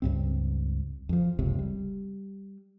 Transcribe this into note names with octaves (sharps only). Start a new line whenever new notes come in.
C#2 G2 C4
F2 F3
F#1 C#2 C3
G3